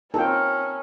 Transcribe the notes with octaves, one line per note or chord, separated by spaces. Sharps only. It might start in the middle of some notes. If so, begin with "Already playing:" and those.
C4 C#4 D#4 F4 A4 A#4 G5